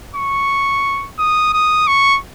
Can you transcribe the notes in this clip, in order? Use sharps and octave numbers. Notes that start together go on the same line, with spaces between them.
C#6
D#6
D#6
C#6